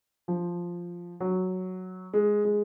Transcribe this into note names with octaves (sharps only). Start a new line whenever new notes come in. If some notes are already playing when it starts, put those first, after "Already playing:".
F3
F#3
G#3
G#3